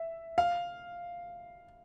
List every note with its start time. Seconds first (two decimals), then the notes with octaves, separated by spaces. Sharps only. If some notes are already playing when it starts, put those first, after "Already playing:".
Already playing: E5
0.38 F5